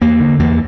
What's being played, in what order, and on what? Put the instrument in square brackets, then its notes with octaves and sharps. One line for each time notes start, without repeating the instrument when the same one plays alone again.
[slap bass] E2 A#3
D3
E2 A#3